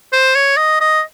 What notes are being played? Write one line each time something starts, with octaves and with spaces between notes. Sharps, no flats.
C5
C#5
D#5
D#5